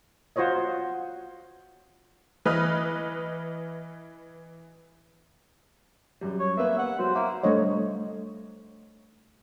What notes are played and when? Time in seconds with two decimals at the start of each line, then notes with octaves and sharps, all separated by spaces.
0.36 F4 F#4 C5 C#5 D#5
2.45 E3 B4 D#5 D#6 F6
6.21 F#2 G3
6.39 C#5
6.57 A#3 B3 B4 E5
6.78 F#5
6.99 F#3 C5
7.15 A#3 E5
7.43 G3 A3 D4 C5 C#5 D#5